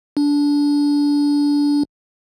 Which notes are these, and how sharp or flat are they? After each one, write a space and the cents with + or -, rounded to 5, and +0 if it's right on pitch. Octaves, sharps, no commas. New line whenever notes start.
D4 -20